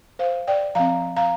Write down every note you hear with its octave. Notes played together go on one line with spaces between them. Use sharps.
C5 F5
D5 G5
F3 C4 F5 A#5
F5 A#5